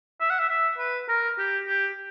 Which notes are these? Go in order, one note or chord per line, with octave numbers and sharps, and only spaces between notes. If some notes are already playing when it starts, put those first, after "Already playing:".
E5
F#5
E5
E5
B4
A#4
G4
G4